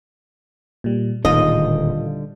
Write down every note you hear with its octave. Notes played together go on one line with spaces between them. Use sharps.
A#2 G3
D1 A#2 D3 D#3 G3 F4 C5 D#5